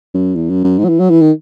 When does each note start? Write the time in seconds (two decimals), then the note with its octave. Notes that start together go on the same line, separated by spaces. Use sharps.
0.14 F#2
0.35 E2
0.50 F#2
0.64 F#2
0.79 G#2
0.85 F#3
0.89 E3
1.00 F#3
1.10 E3
1.21 D#3